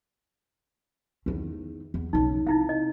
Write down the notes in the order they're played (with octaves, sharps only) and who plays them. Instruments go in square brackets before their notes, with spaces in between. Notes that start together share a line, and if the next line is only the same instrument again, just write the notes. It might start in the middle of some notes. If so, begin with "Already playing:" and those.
[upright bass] E2 D#3
E2
[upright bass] B1 C#3 [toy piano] D#4
[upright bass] C3 [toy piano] D#4 E4 F5
[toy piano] D#5